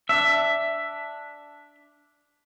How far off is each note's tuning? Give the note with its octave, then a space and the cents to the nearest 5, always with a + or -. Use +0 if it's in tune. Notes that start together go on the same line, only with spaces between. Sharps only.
D4 +0 E5 +10